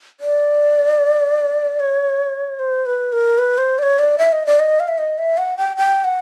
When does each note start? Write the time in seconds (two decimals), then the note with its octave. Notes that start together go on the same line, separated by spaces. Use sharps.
0.20 D5
1.80 C#5
2.59 C5
2.86 B4
3.13 A#4
3.38 B4
3.58 C5
3.79 D5
3.83 C#5
3.99 D5
4.18 E5
4.32 D#5
4.46 D5
4.60 D#5
4.80 F5
4.88 E5
4.98 D#5
5.18 E5
5.38 F#5
5.58 G5
5.77 G5
6.04 F#5